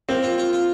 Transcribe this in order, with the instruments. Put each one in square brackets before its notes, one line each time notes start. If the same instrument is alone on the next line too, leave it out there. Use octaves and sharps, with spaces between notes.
[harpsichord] A#3 [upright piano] C4
[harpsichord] F4
F4
F4